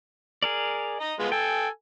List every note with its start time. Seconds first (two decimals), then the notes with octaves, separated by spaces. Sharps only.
0.43 G#4 A#4 D5
1.01 D#5 A#5
1.20 G#3 B3 F4
1.32 A4 G5 G#5